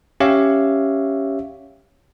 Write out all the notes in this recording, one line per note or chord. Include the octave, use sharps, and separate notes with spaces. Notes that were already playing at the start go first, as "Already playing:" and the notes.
C#4 G4 C#5 E5 F5